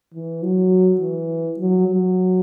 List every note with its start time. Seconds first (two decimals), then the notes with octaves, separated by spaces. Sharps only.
0.15 E3
0.43 F#3
1.00 E3
1.58 F#3
1.87 F#3